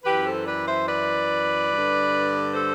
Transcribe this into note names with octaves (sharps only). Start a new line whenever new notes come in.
F#2 E3 G4 B4
A4 C5
B4 D5
C5 E5
B4 D5
G2 D3
A4 C5